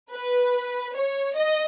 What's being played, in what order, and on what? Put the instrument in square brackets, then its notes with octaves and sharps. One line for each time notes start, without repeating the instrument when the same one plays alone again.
[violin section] B4
C#5
D#5